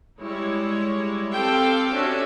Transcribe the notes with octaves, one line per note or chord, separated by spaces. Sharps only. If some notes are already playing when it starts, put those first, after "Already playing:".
G3 G#3 E4 C#5
C4 G4 A4 F5 G5
C#4 D4 F#4 E5